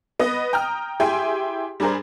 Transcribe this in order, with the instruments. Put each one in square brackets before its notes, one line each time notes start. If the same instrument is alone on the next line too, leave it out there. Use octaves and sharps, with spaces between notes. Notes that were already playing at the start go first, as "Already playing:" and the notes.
[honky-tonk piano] B3 D#5
G5 A#5 D#6 F6
E4 G4 G#4 G5 G#5 C6
G3 D4 G#4 A#4 C5